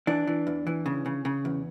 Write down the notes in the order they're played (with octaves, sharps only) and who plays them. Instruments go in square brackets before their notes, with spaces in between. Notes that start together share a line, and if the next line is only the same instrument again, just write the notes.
[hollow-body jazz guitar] E3 D4
E3
E2
E3
C#3
C#3
C#3
E2